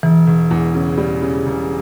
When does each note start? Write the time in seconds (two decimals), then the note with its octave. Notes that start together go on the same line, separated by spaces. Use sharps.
0.03 E1 E3
0.27 E1
0.51 E2
0.75 C#3
0.98 G3
1.22 C#3
1.46 E1